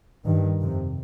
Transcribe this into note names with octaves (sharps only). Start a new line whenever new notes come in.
G2 D#3
F2 C3